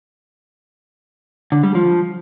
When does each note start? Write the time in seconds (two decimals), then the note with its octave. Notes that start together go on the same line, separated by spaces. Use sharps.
1.52 D3
1.63 G3
1.75 F3